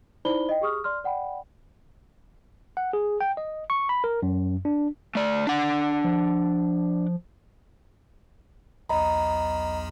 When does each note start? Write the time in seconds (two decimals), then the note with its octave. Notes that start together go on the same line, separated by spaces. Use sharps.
0.25 D#4 E4 C5 D5 B5 G7
0.49 D#5 G5
0.61 G4 G#4 C#6 D#6 F6
0.84 D5 C6 F6
1.04 D5 F#5 G5 B5
2.77 F#5
2.93 G#4
3.21 G5
3.37 D#5
3.70 C#6
3.89 B5
4.04 A#4
4.22 F#2
4.65 D4
5.15 A3 D5
5.47 D4 F#5
6.04 F3
8.89 B1 E2 D#5 A#5 B5